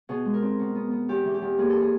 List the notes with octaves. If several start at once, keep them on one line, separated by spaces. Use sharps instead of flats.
B2 G#4
G#3
A#4
C4
B2
B3
B3
E2 G4
E3
G4
E2
A#3 G#4
A4
G#4